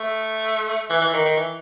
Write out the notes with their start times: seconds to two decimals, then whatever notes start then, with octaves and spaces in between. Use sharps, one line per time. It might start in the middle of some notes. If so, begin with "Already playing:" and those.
Already playing: A3
0.90 E3
1.01 E3
1.13 D#3
1.25 D#3
1.37 E3